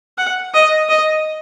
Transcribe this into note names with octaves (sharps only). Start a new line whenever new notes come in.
F#5
D#5
D#5